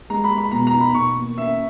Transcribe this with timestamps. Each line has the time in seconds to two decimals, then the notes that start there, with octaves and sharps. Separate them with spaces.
0.10 G#3 A#5
0.24 B5
0.31 G#3
0.38 B5
0.51 B2 A#5
0.67 A#5
0.74 D#4
0.81 B5
0.94 B2 C#6
1.16 A#3
1.37 C#4 E5